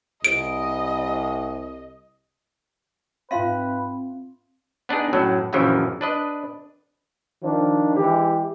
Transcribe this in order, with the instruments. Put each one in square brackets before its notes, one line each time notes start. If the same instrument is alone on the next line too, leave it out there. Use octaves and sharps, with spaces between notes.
[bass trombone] C2 [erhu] D#5 [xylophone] D7
[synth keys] G#2 F4 G5 [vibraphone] C4 [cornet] B4 [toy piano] E5 F5 C6
[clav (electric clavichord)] B3 D4 D#4 G#4
F#2 A2 F#3
A#1 F#2 A#2 C#3 E3 F3
D4 B4 D#5
[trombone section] D#3 F3 D4
E3 G#3 G4